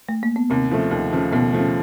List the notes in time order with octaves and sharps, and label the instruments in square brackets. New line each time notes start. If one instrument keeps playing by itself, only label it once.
[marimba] A3
A#3
B3
[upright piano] D#2 [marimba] C3 C4
[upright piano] C#3 F3 A3
D#2
C#3 F3 A3
[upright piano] D#2 [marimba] B2 B3
[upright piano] C#3 F3 A3